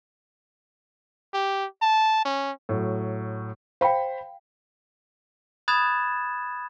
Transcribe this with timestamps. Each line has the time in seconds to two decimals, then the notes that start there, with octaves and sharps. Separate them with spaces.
1.34 G4
1.82 A5
2.25 C#4
2.69 A2 F#3
3.81 C5 F5 G5 B5
5.68 B5 D#6 F#6 G#6 A6 E7